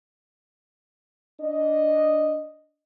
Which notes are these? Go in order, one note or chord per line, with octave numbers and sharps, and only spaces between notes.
D4 D#5